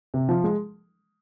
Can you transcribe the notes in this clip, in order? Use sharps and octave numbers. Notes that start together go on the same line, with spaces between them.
C3
F3
G#3